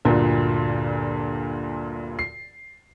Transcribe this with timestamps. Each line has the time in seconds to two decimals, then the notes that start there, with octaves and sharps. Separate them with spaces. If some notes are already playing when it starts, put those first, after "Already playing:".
0.05 D2 G2 A#2 F4 A#4
2.19 C7